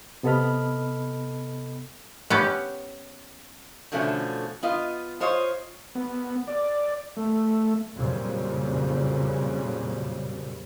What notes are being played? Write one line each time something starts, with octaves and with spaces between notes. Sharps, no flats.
C3 B3 A4 D#5 B5 F6
B3 C#4 G4
B2 D3 F3 A3 C4 C#4
B3 F4 D#5
F4 C5 C#5 D#5
B3
D5
A3
F2 A#2 C#3 F#3 G3